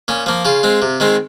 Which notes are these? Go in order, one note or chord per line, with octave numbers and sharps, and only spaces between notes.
A#2 C#4
F3 A#3
C#3 F4
G#3 C4
C3
D#3 G#3 C4